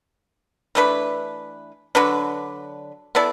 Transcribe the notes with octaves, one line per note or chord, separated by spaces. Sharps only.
E3 A3 D4 B4
D3 F#3 D4 B4
B3 E4 A4 D5